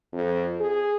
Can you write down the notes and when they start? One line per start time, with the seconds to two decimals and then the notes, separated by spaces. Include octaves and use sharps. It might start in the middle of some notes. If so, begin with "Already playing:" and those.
0.13 F2
0.60 G#4